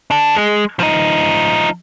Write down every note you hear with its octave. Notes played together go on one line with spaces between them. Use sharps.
D4 A4
G#3
F3 D#4